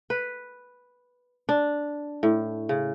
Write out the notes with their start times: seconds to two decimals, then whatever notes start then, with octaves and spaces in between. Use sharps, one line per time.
0.10 B4
1.49 D4
2.23 A2
2.69 C#3